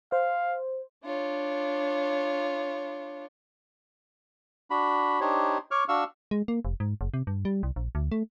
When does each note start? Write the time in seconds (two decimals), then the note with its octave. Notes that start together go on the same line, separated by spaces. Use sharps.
0.12 C5 F5
1.04 D4 F4 C#5
4.71 D4 F#4 B5
5.21 D4 D#4 G4 C5 C#5
5.71 C#5 C#6 D6 F6
5.89 D4 F#4 F5 C#6 E6
6.31 G#3
6.48 A#3
6.65 F1
6.80 G#2
7.01 F#1
7.14 C3
7.27 G2
7.45 G3
7.63 C2
7.76 A#1
7.95 D2
8.12 A3